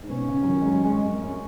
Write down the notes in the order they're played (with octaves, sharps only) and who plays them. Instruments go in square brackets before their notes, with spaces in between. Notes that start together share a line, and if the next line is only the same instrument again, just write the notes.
[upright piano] G#2
[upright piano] B2 [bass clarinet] C#4
[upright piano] C#3
F#3
D#3
G#3
F#3
G#3
F#2
[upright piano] F#2 [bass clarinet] C#4